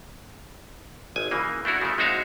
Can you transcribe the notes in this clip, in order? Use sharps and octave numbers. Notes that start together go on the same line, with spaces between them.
G#1 G#5
C#3 E3 A#3
A3 D4 E4 F#4 A#4
C#3 F3 A3
G#3 C4 D#4 F#4 E5 F5